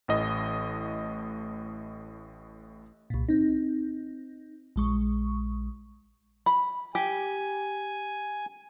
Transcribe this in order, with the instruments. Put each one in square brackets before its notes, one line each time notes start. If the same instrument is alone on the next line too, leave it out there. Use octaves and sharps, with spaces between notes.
[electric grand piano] A1 A2 D#5
[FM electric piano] C2 A#2
C4 D#4
A#1 G#3 C#6
[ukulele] B5
[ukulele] G4 [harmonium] G#5